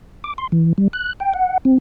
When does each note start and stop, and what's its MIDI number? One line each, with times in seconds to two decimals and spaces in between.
0.24 0.34 86
0.38 0.47 84
0.52 0.73 52
0.78 0.88 55
0.93 1.13 90
1.20 1.33 79
1.34 1.58 78
1.65 1.78 60